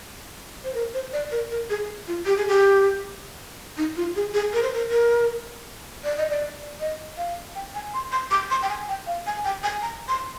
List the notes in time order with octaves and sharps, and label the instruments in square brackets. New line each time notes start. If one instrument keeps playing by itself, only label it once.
[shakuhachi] C5
A#4
C5
D5
A#4
A#4
G#4
F4
G4
G#4
G4
D#4
F4
G#4
G#4
A#4
C5
A#4
A#4
D5
D#5
D5
D#5
F5
G5
G#5
C6
C6
D6
C6
G5
G#5
G5
F5
G#5
G5
G#5
A#5
C6